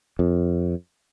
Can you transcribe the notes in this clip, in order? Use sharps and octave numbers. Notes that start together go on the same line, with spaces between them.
F2